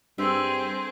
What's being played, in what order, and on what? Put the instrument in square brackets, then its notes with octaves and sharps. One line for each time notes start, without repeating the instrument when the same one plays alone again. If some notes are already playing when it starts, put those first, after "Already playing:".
[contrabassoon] G2 [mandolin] A3 E5 [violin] C4 G#4